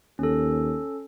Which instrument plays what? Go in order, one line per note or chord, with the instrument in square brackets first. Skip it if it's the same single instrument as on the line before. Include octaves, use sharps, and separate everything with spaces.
[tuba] D#2 [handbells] C#4 A4